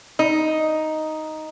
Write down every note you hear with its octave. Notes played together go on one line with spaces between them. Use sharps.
D#4